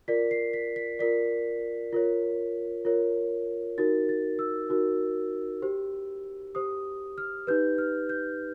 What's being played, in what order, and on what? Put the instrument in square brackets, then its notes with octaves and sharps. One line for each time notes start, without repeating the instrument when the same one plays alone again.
[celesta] F4 A#4 D5 B6
C7
B6
B6
F4 A#4 D5 B6
F4 A#4 C#5
F4 A#4 C#5
D#4 F#4 A#4 A6
A6
E6
D#4 F#4 A#4
G4 C5
G4 C5 D#6
F6
D#4 G4 B4 G6
F6
G6